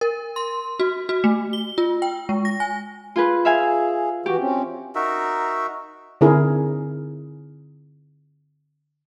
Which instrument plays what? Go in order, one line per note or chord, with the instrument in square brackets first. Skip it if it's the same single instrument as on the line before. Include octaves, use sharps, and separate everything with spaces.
[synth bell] A#4
C6
F#4
F#4
A3
G7
F4
G5
G#3
A#6
G#5
[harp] F4 G#4 B4
[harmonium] G#4 [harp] E5 F5 G#5
[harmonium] E3 F#4 [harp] G4
[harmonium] C4 C#4
[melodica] D#4 F#4 A#4 E5
[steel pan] D3 C4 D#4 E4 G#4 A#4